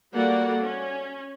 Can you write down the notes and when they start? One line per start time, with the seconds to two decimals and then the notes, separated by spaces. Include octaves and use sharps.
0.12 G3 A#3 F#4 A4 D5 F#5
0.62 C#4